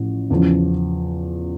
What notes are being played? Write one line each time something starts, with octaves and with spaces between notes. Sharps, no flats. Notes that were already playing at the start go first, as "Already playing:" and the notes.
Already playing: A1 A2 F3
E2 C#3 F3